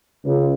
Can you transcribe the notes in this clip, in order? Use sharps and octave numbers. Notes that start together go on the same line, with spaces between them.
C#2